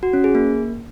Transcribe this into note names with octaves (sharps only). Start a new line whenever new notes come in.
F#4
C#4
G#4
A#3